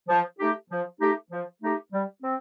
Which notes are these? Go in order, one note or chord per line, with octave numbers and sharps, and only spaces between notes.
F3
A3 D#4 G4
F3
A3 D#4 G4
F3
A3 D#4 G4
G3
C4